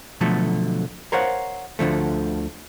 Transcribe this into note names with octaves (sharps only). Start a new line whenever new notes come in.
B2 D3 F3 F#3 A3 A4
A#4 C5 C#5 F5 F#5
D2 D3 F3 A3